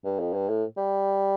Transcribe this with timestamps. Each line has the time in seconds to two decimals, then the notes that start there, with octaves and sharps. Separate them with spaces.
0.05 G2
0.20 F2
0.34 G2
0.49 A2
0.77 G3